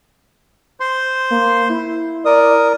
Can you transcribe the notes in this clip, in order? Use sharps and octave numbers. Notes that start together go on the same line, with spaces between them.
C5 C6
A#3
E4
A#4 D5 D#6